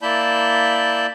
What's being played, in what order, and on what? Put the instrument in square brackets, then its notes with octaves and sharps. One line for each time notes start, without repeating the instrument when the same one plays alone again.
[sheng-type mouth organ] A#3 E4 D5 A5 B5 G6